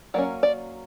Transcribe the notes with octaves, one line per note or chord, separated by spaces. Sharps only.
F#3 A#3 C#4 D5
D5